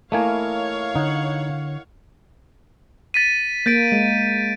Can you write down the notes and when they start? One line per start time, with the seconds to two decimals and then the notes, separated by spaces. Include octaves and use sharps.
0.12 A3 A#3 E4 A#4 C#5 D#5 F5 G#5
0.95 D3 D#4 F#5
3.14 A6 B6 D#7
3.66 A#3 G6 A6 D7
3.92 G#3